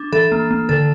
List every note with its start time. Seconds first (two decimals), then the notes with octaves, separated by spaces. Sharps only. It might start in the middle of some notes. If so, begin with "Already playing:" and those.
Already playing: D4
0.12 E3 A4
0.32 A#3
0.51 A#3
0.69 D3 A4